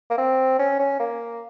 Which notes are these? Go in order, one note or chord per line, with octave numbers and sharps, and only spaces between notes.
A#3
C4
C#4
C#4
A#3